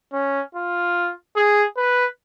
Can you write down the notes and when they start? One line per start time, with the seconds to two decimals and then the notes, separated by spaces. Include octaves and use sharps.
0.13 C#4
0.55 F4
1.36 G#4
1.77 B4